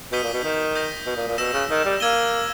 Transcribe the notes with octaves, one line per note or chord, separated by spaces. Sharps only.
B2 D#6 G6 B6 D#7 G7
A#2
B2
D#3
D#6 G6 A#6 D#7
B2
A#2
A#2
B2 E6 A#6 E7
C#3
D#3
G3
A#3 E6 G#6 D#7 G7